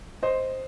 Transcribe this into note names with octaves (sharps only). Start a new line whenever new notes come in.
C5 D#5